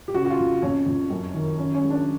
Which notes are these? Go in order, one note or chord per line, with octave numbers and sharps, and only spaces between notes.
G4
C#3 F#4
F#4
F4
F2
F2 C#4
F2
F#2
D#3
D#3 C#4
C#4
G#3
D4